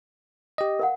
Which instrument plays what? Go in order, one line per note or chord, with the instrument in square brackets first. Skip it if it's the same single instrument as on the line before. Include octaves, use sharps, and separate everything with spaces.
[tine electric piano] G4 D#5
[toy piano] A#4 F5 F#5